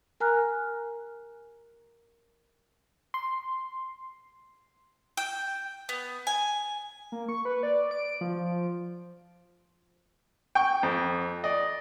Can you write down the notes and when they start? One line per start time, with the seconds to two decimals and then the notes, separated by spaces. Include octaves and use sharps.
0.20 A#4 G#5 A#5 F6 F#6
3.14 C6
5.17 G5
5.89 B3
6.27 G#5
7.12 A#3
7.28 C#6
7.45 B4
7.63 D5
7.91 D7
8.21 F3
10.55 G5 C#6
10.83 F2
11.44 D5 D#5